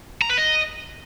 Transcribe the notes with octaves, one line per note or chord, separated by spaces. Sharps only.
A#5
B4
D#5